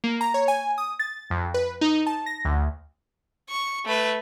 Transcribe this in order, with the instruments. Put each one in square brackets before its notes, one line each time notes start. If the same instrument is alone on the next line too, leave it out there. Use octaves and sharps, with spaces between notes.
[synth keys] A#3
A#5
C#5
G#5
D#6
A6
F2
B4
D#4
A5
A#6
D2
[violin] C#6
A3 B4